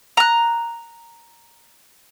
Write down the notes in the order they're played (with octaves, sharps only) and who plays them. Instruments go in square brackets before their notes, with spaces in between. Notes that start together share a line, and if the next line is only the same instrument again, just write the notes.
[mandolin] A#5 F#6